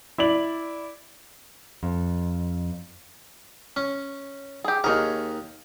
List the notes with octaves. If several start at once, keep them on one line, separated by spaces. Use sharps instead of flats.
E4 D5 F#7
F2
C#4
G4 G#4
D#2 D#3 G#4 A#4 C#5